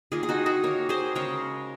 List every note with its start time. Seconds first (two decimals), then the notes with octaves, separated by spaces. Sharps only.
0.12 D#3 A#3 F4 G#4
0.23 G#4
0.29 D#4 F#4
0.46 D#4 F#4
0.63 D#3 A#3 A#4 C#5
0.89 G#4 C5
1.15 C#3 G#3 A#4 C#5